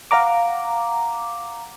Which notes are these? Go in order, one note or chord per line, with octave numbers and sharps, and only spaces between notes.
F5 F#5 A#5 D6